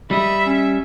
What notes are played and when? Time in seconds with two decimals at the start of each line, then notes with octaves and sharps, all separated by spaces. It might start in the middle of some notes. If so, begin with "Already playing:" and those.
0.11 G3 D#5 E5 B5
0.46 C#4